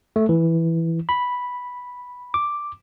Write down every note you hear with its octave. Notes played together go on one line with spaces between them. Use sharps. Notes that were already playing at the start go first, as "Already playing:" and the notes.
A3
E3
B5
D6